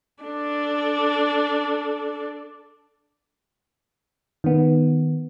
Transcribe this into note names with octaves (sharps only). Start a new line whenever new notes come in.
D4 A4
D#3 B3